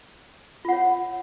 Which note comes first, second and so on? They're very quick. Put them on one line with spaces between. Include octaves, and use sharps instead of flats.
F4 F#5 C#5